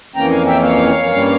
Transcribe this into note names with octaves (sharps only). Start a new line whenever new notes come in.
F2 E3 A#3 C#4 G5 A#5
F5 G#5
E5 G5
C#5 F5
G2 G3 A#3 C#4